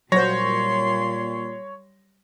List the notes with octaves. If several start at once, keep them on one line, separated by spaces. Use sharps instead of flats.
A#2 F#3 G3 F#4 C5 C#5 C6 A#6